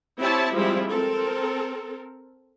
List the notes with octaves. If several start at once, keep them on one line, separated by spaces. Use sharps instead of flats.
C4 E4 G4 C#5 E5 A5
F3 G3 G#3 C4 E4 F4
C4 A4 A#4